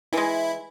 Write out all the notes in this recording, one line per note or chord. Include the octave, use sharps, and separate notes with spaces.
E3 G#3 E4